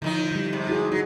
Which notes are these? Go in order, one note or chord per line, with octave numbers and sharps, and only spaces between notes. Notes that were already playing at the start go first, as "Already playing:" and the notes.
A2 D3 D#3 F3 D#4
D3 G3
G#2 C3
E4 F#4 G#4
F#3 D#4 F#4 G#4